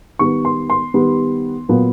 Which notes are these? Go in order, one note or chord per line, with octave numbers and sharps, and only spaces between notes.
D#3 G3 B3 C#6
C6
C6
D#3 G3 B3
A#2 F#3 B3